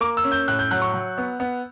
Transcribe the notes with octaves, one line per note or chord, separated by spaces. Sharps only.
A#3 D6
E6
C#4
G6
A2 F#6
G6
F#3 F#6
C#6
F#3
B3
B3